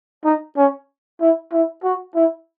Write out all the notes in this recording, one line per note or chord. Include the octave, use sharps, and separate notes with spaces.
D#4
C#4
E4
E4
F#4
E4